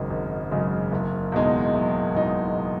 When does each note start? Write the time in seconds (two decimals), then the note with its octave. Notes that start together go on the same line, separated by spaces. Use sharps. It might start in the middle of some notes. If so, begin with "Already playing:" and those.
Already playing: G#1 F#2 C#3 G#3
0.10 G#1
0.51 F#2 C#3 G#3
0.92 F#1
1.32 E2 B2 G#3 D#4
1.74 F#1
2.15 E2 B2 G#3 D#4